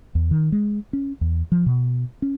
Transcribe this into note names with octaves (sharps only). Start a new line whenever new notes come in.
E2
D#3
G#3
C#4
E2
F3
B2
C#4